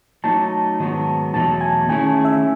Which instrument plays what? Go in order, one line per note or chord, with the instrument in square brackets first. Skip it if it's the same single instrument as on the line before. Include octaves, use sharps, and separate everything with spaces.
[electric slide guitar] F#3 A3 D#4 [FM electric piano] A5
[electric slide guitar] G#2 D#3 F#3 B3
[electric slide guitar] E2 B2 F#3 A3 [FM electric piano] A5
[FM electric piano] G#5
[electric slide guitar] D#3 A3 C#4 E4 G#4 [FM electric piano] G#5
[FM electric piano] G#5
E5